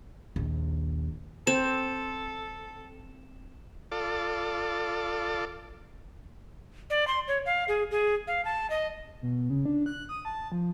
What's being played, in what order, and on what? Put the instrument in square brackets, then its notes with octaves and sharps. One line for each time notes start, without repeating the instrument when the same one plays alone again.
[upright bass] A#1 D#2
[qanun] C4 [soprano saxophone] A4 [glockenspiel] E7
[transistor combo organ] F4 A4 D5
[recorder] D5
C6
C#5
F5
G#4
G#4
F5
A5
D#5
[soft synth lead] B2
C#3
D4
F#6
D#6
A5
F3